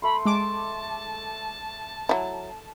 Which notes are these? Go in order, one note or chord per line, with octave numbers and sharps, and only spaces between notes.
A3 B5 C6
G#3 A5 D6
F#3 E4